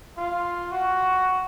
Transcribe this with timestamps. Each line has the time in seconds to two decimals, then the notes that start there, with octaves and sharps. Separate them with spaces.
0.17 F4
0.71 F#4